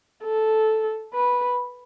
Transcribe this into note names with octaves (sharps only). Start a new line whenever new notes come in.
A4
B4